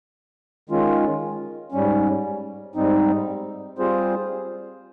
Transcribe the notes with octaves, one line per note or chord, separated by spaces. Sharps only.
D#3 G#3 C#4 F4
G#2 G3 C#4
G#2 G3 C4 D#4
G3 C4 F4 G#4 C5